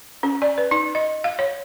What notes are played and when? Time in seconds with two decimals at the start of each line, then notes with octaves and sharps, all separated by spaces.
0.23 C#4
0.42 D5
0.58 B4
0.71 D#4
0.95 D#5
1.24 F5
1.39 C#5